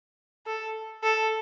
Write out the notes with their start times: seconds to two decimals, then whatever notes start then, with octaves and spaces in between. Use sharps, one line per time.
0.46 A4
1.03 A4